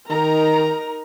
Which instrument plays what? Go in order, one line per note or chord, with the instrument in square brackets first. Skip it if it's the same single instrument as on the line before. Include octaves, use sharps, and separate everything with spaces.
[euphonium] D#3 [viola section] D#4 A#4 A#5